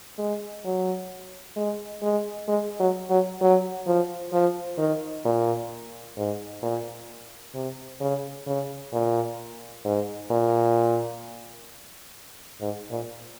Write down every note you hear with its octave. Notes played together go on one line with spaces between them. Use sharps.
G#3
F#3
G#3
G#3
G#3
F#3
F#3
F#3
F3
F3
D#3
A#2
G#2
A#2
C3
C#3
C#3
A#2
G#2
A#2
G#2
A#2